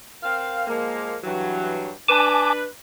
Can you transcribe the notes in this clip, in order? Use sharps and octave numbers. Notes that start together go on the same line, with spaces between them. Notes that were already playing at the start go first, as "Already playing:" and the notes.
C4 A#4 F5
F3 G#3 A#3
G2 E3 F#3
D4 B4 G#5 A5 D6